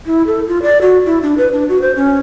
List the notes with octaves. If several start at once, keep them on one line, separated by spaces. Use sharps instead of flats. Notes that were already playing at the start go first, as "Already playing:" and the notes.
E4
A4
F4
D5
F#4
E4
D4
B4
D4
F#4
C5
C#4